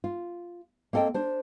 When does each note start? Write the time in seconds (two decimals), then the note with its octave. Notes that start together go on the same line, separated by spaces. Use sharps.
0.04 F4
0.93 A#3 C4 A4 D#5 G5
1.14 D4 C5